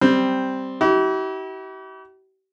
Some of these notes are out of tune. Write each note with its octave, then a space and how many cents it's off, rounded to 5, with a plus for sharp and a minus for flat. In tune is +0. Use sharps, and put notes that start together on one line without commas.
G3 +0 C4 +0
E4 -35 G4 -45